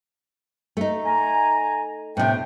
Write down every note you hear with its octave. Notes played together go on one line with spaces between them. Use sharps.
A3 D#4
G#5 A#5
A2 C3 B3 D4 G5